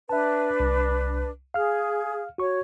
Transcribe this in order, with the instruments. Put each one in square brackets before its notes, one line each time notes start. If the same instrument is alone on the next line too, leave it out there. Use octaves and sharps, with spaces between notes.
[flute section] D4 B4 [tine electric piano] E5 A5
[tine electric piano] C2
[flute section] G#4 [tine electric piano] F5 F6
[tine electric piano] F#4 C#6 [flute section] C#5